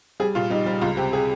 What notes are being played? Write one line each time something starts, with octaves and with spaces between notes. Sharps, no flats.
G3 G#4
A#2 F4
G3 D#4
G3
C#2 F4
C3 G4
G#4